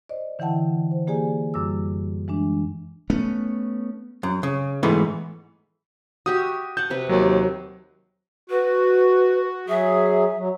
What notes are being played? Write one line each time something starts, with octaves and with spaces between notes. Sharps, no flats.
C5 D5 D#5
D3 E3 E4 F#5 G5 A5
C5
A#3 G4 G#4 D5 G#5
F#2 G3 D6 E6
E3 G#3 D4
A3 B3 C#4
F#2
C#3
G#2 E3 A3 B3
F#4 G4 E5 D#6
F#5 A5 G6
C3 B4
D#2 F#3
F#4 B4
F#3 G#4 E5
F#3